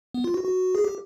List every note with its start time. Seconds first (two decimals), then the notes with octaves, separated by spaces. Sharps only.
0.14 B3
0.24 F4
0.34 F#4
0.44 F#4
0.75 G#4
0.84 G4